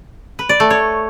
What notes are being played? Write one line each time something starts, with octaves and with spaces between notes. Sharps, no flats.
B4
D5
A3
C#5